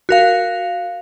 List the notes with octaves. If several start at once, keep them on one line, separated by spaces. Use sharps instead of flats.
F#4 A#4 F5